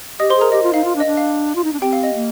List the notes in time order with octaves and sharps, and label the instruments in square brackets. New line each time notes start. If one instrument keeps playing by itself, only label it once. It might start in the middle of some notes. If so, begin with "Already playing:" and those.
[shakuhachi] G4 [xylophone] D#5 D#6
[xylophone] C5 C6
[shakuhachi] G#4
[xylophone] A#4 A#5
[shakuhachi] G4 [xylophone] D#5
[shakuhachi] F4
[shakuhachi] D#4 [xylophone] F5
[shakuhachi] F4
D4
[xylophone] D#5
[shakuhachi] D4
[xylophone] F5
[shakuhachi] F4
D#4
D4
[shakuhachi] C4 [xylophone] G4 G5
[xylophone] F5
D#5
[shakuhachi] A#3